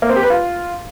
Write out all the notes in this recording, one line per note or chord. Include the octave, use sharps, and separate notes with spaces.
A#3
C4
G4
B4
F4